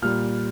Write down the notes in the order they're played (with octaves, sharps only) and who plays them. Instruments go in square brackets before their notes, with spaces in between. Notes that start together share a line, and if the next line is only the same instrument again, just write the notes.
[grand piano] A#2 G3 F6